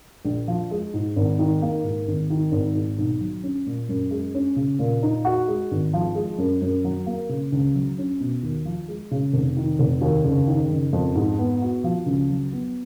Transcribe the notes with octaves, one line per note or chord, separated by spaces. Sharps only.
A#1
F3
G#3
G#2
G#1
D#3
A#3
G#2
G#1
D#3
G#1
G#2
B1
F#3
C#4
A#2
F#2
G#3
C#4
C#3
A#2
D#4
F#4
G#3
G#1
F3
G#3
F#2
F#2
F#3
A#3
C#3
C#2
F#3
C#4
B2
D#2
F3
G#3
C#3
F1
D#3
F1
D#2
F#1
D#3
F#1
F2
G#2
B3
F#4
F3
C#2
F#3
B3